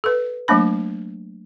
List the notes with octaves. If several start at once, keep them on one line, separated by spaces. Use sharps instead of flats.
A4 B4
F#3 A3 A#3 D4 B5